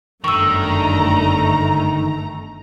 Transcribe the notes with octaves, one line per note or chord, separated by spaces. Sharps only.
G1 F#2 D3 D#3 A3 A#5 C#6 E6